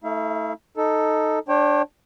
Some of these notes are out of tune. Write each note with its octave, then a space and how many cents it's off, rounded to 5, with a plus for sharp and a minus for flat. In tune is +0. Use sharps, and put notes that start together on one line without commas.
A3 +0 E4 -40 F5 -45
D#4 +0 A4 +0
D4 +0 C#5 -40 G5 +0